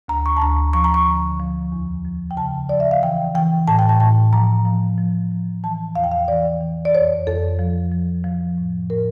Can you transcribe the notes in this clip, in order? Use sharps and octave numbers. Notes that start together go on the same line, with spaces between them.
D2 A#5
C#6
A5
D2 A#5
F3 C#6
A#5
C#6
D3
F3
E2
F3
G5
C#3 A5
F3 D5
E5
F5
E3 G5
E3 G5
A2 A5
G5
A5
A2 A5
F3 A#5
F3
F3
F3
E3 A5
E2 F5
G5
F5
E3 D5
E3
D5
F2 C#5
F2 A4
F3
F3
F3
A2
A2 A#4